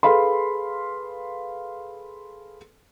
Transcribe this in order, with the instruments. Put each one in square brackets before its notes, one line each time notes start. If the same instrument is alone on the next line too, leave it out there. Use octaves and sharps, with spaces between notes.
[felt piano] G#4 A4 B4 F5 B5 C6